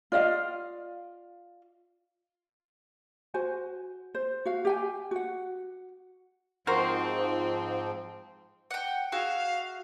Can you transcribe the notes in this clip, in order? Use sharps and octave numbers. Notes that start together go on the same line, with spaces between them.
F4 D5 D#5 F5
F#4 C5 G#5
C5
F#4 F5
G4 G5 G#5
F#4 F#5
G#2 F3 C4 F#4 A#4 C5
F#5 G5
F#4 G#4 E5 F5